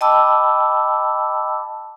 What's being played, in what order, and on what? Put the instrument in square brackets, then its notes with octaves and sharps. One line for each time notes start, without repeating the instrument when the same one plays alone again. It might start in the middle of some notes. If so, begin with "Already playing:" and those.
[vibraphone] D#5 G5 A5 B5 D6 E6